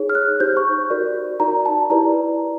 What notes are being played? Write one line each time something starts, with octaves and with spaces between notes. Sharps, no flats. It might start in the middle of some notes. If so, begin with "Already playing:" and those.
Already playing: D#4 G#4 C#5
F6
F#6
D#4 G4 C5 G6
C#6
F#4 A#4 D5
D#4 F#4 A#4 D5 A#5
A5
E4 G4 B4 D5 A#5